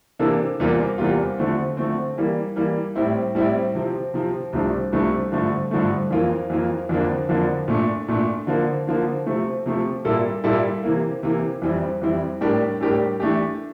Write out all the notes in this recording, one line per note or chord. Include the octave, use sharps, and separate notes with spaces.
C3 E3 A#3 D4 A4
E2 C3 G3 A#3 F4
E2 C3 G3 A#3 F4
D3 F3 A3 C4
D3 F3 A3 C4
E3 G3 A#3
E3 G3 A#3
A2 G3 C4 E4
A2 G3 C4 E4
C3 F3 C4
C3 F3 C4
C2 C3 F3 A3 D4
C2 C3 F3 A3 D4
G2 D3 F3 A3
G2 D3 F3 A3
F2 E3 A#3 F4 A#4
F2 E3 A#3 F4 A#4
F2 D3 F3 A#3 D4
F2 D3 F3 A#3 D4
A#2 A3 D4
A#2 A3 D4
D3 F3 A#3
D3 F3 A#3
C3 F3 A3 C4
C3 F3 A3 C4
A#2 G3 A#3 E4 A4
A#2 G3 A#3 E4 A4
C3 E3 A#3
C3 E3 A#3
F2 E3 G3 C4 E4
F2 E3 G3 C4 E4
A2 G3 D4 G4 A#4
A2 G3 D4 G4 A#4
E3 A3 D4 G4